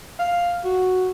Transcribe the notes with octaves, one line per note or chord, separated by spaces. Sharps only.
F5
F#4